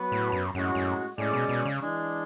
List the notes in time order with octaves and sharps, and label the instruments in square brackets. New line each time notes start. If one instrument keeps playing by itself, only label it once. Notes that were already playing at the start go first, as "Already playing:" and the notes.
Already playing: [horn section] F#3 B3 F#4 B4
[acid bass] A2
F#2
[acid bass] F#2 [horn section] A2 G#3 C#4 F#4
[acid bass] F#2
[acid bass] A2 [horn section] G#3 C#4 G#4 D5
[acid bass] B2
B2
C#3
[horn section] E3 G#3 D4